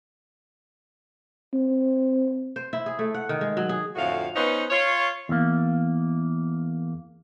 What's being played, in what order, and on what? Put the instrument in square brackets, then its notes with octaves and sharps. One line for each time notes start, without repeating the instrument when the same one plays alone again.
[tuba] C4
[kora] C5
E4
G#4
A3
F#5
D#3
G#3
F#3
G#4
[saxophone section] F2 A2 D3 F#4 F5
B3 C#4 D#4 B4 C5
F4 C#5
[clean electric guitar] E2 A#3